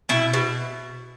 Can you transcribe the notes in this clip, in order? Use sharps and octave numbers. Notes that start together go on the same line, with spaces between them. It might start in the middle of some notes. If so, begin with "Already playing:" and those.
B2 E4
B2